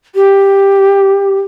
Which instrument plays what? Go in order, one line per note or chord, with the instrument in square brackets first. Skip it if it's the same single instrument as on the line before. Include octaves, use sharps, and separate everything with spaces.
[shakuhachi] G4